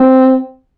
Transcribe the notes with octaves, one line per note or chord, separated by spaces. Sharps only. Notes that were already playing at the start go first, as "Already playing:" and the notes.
Already playing: C4